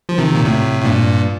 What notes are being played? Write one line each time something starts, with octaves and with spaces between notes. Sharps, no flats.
F3
C3 D#3
A#2
A2 C3
A2
G2 A#2